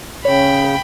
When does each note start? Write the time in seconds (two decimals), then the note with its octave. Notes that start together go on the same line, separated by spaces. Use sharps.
0.25 C#3 C#5 G5 B5